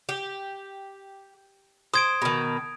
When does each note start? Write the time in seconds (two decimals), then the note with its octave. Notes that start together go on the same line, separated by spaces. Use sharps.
0.09 G4
1.94 C5 D#6 G#6 D7
2.22 B2 D#3